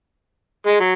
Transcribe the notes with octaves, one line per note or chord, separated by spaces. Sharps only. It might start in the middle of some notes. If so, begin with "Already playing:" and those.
G#3
F#3